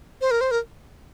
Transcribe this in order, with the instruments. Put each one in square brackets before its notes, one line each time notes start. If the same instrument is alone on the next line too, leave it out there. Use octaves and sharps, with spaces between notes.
[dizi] C5
A#4
C5
A#4